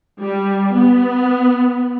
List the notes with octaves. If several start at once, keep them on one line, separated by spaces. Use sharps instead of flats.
G3
B3